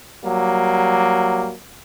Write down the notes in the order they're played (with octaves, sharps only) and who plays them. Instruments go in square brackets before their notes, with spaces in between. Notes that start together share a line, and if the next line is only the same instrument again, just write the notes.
[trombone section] F#3 G3 A#3